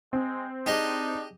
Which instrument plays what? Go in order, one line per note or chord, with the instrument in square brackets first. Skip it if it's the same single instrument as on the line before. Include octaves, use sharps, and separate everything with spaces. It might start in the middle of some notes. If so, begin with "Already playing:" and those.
[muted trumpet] G#3 [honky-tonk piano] C4
[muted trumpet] D4 [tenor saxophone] D#4 [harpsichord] G4 G#4 D#5